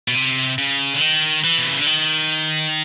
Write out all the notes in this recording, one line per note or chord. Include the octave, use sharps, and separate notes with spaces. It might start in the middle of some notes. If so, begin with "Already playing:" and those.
B2
C3
C#3
D3
D#3
E3
B2
C3
C#3
D3
D#3